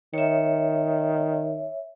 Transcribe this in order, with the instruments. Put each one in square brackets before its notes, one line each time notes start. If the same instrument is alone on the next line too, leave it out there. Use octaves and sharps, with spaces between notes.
[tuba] D#3 [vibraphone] C#5 E5